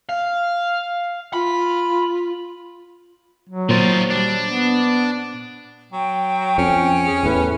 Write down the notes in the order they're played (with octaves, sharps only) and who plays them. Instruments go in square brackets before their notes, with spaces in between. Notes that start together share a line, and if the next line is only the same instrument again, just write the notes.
[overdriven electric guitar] F5
[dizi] F4 [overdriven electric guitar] B5
[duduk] F#3
[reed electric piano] A#2 C5 A6 [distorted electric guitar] D#3 F4
[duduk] G3 [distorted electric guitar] D4
[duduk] B3
[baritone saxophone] F#3 [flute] G5
[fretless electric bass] F2 [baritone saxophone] C#4
[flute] G#4
[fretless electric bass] E2 A2 [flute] B4